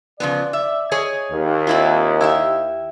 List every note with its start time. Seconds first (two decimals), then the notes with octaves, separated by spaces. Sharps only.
0.20 C#3 F3 B3 D5
0.53 E5
0.91 G#4 C#5 D#5
1.32 D#2
1.67 C4 E4 F4
2.21 E4 G4 E5